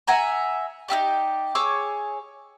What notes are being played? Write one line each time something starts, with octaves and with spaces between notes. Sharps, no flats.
E5 F#5 G#5 A#5
D#4 E4 G4 D5
G#4 C#5 D6 E6